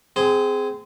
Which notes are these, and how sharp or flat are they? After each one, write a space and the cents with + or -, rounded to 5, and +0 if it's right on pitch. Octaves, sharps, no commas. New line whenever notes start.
C4 -25 G#4 +0